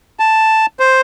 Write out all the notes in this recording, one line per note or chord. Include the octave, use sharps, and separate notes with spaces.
A5
C5